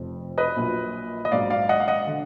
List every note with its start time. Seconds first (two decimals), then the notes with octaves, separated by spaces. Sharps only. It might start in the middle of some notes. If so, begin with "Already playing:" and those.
Already playing: F1 F2 F3
0.38 B4 D#5
0.56 A#1 A#2 F#3
1.25 D#5
1.31 A#1 G#2 F#3 D5 F5
1.50 D5 F5
1.69 D#5 F#5
1.80 F5
1.88 D#5 F#5
2.07 D3